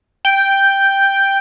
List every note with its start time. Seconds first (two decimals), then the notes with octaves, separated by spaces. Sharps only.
0.25 G5